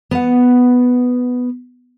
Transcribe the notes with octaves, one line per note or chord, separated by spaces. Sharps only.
B3 F#5